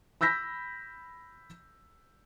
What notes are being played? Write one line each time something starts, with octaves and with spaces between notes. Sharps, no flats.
B5 E6 G6 A#6 B6